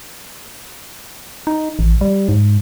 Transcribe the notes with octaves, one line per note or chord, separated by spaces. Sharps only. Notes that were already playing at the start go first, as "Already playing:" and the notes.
D#4
A1
G3
G#2